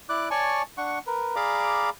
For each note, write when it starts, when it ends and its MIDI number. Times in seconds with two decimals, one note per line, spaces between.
0.09 0.29 64
0.09 0.29 74
0.09 0.29 86
0.09 0.29 90
0.31 0.62 73
0.31 0.62 74
0.31 0.62 80
0.31 0.62 81
0.31 0.62 85
0.78 0.99 62
0.78 0.99 78
0.78 0.99 85
1.07 1.35 70
1.07 1.35 71
1.36 1.90 68
1.36 1.90 74
1.36 1.90 77
1.36 1.90 82
1.36 1.90 83
1.36 1.90 86